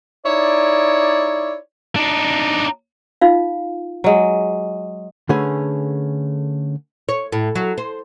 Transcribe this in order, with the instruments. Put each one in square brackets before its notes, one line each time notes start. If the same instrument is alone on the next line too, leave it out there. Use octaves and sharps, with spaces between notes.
[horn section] D#4 E4 C#5 D5
[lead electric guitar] D4 D#4
[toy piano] D#4 F4 F5
[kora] F#3 G#3
[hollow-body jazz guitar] D3 A3 C#4 G#4 B4
[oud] C#5
A2
F#3
C5